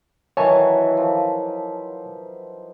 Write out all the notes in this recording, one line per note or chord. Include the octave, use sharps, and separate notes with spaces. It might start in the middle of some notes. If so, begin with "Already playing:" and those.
D#3 E3 F#3 C#5 G#5 A5
F3